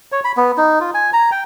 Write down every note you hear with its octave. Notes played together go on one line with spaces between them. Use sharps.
C#5
B5
B3
D#4
F4
G#5
A#5
G5